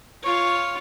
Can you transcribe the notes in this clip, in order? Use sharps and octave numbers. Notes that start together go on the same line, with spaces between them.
F4 C#5